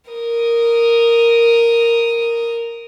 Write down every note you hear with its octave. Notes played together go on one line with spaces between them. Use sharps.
A#4 D#6